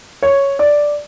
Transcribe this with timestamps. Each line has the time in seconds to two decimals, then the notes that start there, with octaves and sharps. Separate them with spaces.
0.22 C#5
0.59 D5